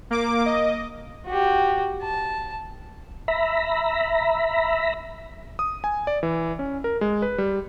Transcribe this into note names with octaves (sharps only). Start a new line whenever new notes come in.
A#3 D6
D#5
F#4 G4
A5
E5 A#5 B5
D#6
G#5
D5
E3
C#4
A#4
G#3
B4
G3